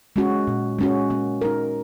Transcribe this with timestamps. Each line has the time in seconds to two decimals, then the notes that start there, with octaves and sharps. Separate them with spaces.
0.16 G#3 C#4 F#4
0.47 A#2
0.79 G#3 C#4 F#4
1.10 A#3
1.41 D#4 A#4